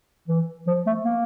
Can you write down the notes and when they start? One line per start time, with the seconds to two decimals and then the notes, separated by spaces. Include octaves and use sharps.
0.28 E3
0.67 F3
0.87 A3
1.05 A#3